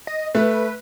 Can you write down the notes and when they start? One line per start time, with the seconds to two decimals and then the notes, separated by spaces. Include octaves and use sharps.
0.07 D#5
0.35 A3 B4